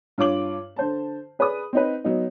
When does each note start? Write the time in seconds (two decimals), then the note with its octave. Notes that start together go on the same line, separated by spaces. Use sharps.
0.18 G2 F4 C#5 D6 F#7
0.76 D3 C5 A5
1.39 G#4 B4 D5 B5 D#6
1.73 C4 D#4 B4
2.04 F#3 B3 D#4